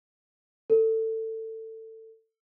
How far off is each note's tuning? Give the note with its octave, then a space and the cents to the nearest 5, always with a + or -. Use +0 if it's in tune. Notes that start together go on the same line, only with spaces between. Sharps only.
A4 +20